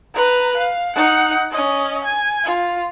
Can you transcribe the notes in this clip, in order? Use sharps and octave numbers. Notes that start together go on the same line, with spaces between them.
B4 A#5
F5
D#4 F#5
C#4 D#5
G#5
F4